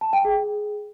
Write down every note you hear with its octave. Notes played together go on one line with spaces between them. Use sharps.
A5
G5
G#4